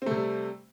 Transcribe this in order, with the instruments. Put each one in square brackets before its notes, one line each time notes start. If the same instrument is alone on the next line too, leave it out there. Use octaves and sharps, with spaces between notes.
[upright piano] C4
A3
C3
G3